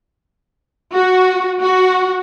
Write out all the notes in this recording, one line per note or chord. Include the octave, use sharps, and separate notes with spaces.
F#4
F#4